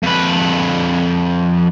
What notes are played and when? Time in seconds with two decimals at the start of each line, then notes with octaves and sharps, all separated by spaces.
0.03 F2 B4